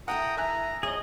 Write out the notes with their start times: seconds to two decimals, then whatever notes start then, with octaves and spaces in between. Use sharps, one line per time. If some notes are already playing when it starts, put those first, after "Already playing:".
0.08 E3 E4 A4 F#5 G5 A#5 D#6
0.37 E5 G#5 A#5 F#6
0.83 F2 G#4 C#5 D#5 F#5